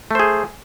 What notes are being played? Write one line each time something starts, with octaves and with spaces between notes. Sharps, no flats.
A3 G#4 C5